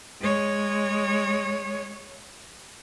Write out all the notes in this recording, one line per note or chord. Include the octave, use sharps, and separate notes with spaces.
G#3 C#5